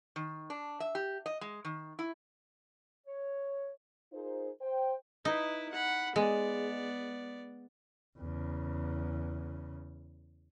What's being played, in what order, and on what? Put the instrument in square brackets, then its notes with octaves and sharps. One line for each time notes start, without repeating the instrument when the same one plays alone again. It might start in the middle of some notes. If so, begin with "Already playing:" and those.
[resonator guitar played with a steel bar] D#3
D4
E5
G4
D#5
G#3
D#3
E4
[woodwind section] C#5
[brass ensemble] D#4 F4 G#4 A#4 C5
C5 G5
[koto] D#4 [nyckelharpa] E4 B4
[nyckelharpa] F#5 B5
[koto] G#3 [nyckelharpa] B3 D5
[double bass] E2 C#3